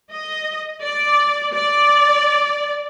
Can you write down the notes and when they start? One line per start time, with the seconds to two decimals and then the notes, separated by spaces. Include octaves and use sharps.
0.12 D#5
0.82 D5
1.55 D5